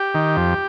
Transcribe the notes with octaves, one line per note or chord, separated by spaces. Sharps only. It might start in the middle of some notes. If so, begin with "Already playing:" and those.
Already playing: G4
D#3
F2